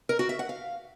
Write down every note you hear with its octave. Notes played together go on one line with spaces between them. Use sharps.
A#4
F#4
E5
F#5
F5